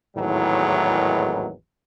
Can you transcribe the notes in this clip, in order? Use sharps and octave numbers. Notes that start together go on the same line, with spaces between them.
G#1 E2 A2 D#3 E3 F#3